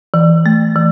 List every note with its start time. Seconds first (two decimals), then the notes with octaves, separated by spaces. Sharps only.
0.14 E3
0.46 A3
0.76 E3